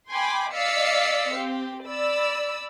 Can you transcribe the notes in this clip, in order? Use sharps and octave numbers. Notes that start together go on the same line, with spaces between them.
G5 G#5 B5 C6 D6
D5 D#5 F5 E6 B6 C#7
C4 G4
D5 B5 E6